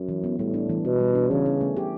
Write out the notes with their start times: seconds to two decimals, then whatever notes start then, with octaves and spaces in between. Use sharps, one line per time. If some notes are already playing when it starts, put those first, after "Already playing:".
Already playing: F#2
0.08 E3
0.24 B3
0.39 A2 G3
0.54 D4
0.69 E3
0.85 B2 B3
1.00 G3
1.15 D4
1.30 C#3 E3
1.46 C#4
1.61 A3
1.77 G4